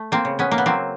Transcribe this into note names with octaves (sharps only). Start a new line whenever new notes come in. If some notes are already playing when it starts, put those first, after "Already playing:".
Already playing: A3
A#3 C4
C#3
B3 C#4
A#3
B3
F#3 A#3 C4